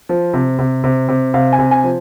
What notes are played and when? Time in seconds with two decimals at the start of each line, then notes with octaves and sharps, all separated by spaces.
0.09 F3
0.34 C3
0.59 C3
0.84 C3
1.09 C3
1.34 C3 F5
1.53 G#5
1.59 C3
1.71 G#5
1.84 F3